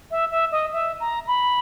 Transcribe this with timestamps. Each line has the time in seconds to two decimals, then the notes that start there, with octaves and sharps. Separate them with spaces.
0.11 E5
0.31 E5
0.52 D#5
0.73 E5
1.00 A#5
1.27 B5